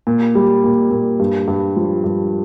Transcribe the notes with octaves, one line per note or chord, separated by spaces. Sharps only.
A#2
G3
A#2
A#2
G2
G2
F3
G2